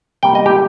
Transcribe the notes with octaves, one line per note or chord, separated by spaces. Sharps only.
C3 G3 A#3 G5
D#5
G4